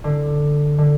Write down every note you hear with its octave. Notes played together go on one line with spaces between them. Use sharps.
D3
D3